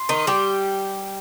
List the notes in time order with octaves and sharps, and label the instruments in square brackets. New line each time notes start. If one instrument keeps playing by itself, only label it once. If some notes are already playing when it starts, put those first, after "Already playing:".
Already playing: [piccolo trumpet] C6
[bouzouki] D#3 D#4
G3 G4